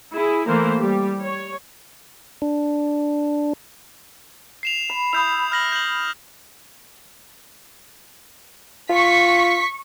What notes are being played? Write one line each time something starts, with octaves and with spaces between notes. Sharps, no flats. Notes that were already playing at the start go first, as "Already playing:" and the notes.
E4 G#4
E3 A3 A#3 A#4 C5
G3 G4
C#5
D4
C7 E7 F7
B5
E4 D#6 G6 F7
F6 A#6 F#7
G6 F#7
F4 C#6 B6